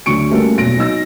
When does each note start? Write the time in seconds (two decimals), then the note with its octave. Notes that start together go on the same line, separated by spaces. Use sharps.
0.06 D2 D3 F#3 C#6 C#7 D7
0.31 G3 A3 A#3 C#4 F#4 A4
0.57 E1 A#2 F#3 A#6 D7
0.77 F#3 D#4 E6 A#6